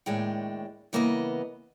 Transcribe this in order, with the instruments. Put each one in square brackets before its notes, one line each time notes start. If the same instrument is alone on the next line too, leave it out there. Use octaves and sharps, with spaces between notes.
[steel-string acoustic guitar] D#2 A2 G#3 D4 C#5 G5
C#3 E3 A#3 B3 B4 D#5